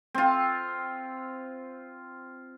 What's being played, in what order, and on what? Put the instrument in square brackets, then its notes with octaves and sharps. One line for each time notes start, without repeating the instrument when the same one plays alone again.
[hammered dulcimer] C4 F4